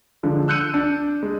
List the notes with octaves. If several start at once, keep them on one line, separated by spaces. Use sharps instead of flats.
D3 F3 G#3
E6 F#6 G6 C#7 D#7
D4
G#3